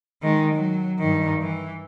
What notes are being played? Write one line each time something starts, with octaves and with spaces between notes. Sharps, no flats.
D#3 G#3
F#3
G2 D#3
E3